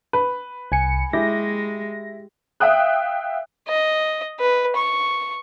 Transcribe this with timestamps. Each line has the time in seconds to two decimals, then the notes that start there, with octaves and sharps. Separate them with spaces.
0.13 B4
0.72 C2 G#5 C#7
1.13 G#3 E4 G4 A#6
2.60 E5 F5 G5 D#6 F#6
3.68 D#5
4.40 B4
4.76 C#6